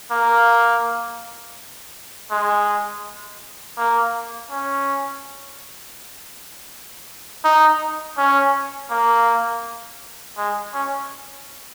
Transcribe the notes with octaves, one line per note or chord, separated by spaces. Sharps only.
A#3
G#3
A#3
C#4
D#4
C#4
A#3
G#3
C#4